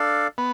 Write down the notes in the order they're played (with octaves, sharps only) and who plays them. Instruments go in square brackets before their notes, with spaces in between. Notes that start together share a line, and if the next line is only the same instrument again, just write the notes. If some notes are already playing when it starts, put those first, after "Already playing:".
Already playing: [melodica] D4 A4 D5 F5
[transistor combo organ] B3